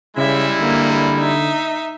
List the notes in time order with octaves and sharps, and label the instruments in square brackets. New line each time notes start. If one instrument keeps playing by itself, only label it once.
[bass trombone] C#3 [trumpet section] G3 G#3 E4 [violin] E5
[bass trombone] D3 [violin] A#3
[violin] D#4 E5